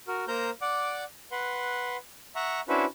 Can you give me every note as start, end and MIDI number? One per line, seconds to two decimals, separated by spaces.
0.08 0.25 66
0.08 0.25 70
0.28 0.50 58
0.28 0.50 70
0.28 0.50 72
0.28 0.50 82
0.28 0.50 91
0.61 1.04 74
0.61 1.04 78
0.61 1.04 86
1.32 1.97 71
1.32 1.97 78
1.32 1.97 84
2.35 2.60 76
2.35 2.60 78
2.35 2.60 82
2.35 2.60 85
2.69 2.85 61
2.69 2.85 62
2.69 2.85 64
2.69 2.85 66
2.69 2.85 71
2.69 2.85 72